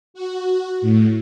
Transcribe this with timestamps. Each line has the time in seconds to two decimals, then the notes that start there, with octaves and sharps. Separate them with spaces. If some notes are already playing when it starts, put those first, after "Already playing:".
0.14 F#4
0.82 A2